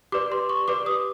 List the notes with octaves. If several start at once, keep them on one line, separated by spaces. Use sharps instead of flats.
G4 B4 D5 D6
C6
C#6
G4 B4 D5 D6
D#6